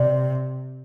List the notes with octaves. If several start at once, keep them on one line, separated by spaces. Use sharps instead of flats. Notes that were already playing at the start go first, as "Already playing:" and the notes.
Already playing: C3 D5